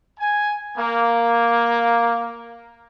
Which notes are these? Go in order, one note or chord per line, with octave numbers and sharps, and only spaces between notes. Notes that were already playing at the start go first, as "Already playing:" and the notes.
G#5
A#3